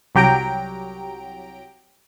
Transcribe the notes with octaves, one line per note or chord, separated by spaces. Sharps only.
C2 F#3 G4 G5 A#5 D7